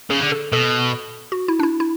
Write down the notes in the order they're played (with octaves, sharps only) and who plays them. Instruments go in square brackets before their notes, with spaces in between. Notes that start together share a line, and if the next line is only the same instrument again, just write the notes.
[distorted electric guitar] C#3 [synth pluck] G#4
[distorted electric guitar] D3
[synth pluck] A4
[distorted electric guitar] B2 [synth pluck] A4
[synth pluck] F#4
E4
D4
E4
E4